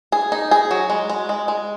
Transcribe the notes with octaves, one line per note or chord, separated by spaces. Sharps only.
G#4
D#4
G#4
F#3
G#3
G#3
G#3
G#3